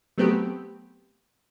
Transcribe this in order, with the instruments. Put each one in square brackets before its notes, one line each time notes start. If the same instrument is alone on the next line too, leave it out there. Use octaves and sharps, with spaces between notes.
[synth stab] F#3 A3 B3 C4 G4